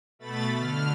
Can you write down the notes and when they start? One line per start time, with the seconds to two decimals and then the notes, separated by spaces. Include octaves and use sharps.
0.19 B2 A3 B5 A6
0.55 D3 F6